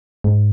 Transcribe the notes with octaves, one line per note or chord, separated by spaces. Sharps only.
G#2